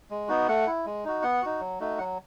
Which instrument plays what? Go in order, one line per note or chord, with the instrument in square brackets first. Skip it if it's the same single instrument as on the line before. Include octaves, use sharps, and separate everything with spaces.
[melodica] G#3
B3 D#4 F#4
A3 F#5
E4
G#3
D#4 F#4
B3 F#5
D#4 F#4
F#3
A3 D#4 F#4
F#3 F#5